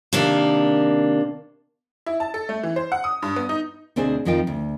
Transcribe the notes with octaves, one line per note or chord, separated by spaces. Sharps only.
C3 D#3 A#3 D4
E4
A5
A4
A3
E3
C5
F#5
D#6
G2
B3
D#4
D2 B2 C4 D4 G#4 C5
F2 D#3 F3 D#4 F4 G5
D2